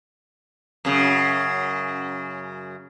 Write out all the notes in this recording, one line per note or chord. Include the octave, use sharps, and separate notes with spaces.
F#2 C#3